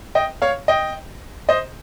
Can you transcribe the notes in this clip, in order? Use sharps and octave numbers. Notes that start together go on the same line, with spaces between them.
D#5 G5
C#5 F5
D#5 G5
C5 D#5